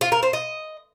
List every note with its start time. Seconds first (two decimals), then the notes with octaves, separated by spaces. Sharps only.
0.01 F4
0.12 A#4
0.23 C5
0.33 D#5